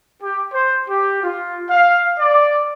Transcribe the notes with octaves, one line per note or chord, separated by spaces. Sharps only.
G4
C5
G4
F4
F5
D5